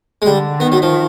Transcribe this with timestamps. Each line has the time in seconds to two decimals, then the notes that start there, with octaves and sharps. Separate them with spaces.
0.22 G#3
0.26 D3 G3
0.60 D#3 B3
0.72 F#3
0.82 F3